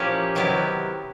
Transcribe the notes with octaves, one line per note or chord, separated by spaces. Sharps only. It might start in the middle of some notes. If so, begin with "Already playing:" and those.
Already playing: A#2 F3 A#3 C#4 E4 G4
C3 D#3 F#3 B3 E4 G4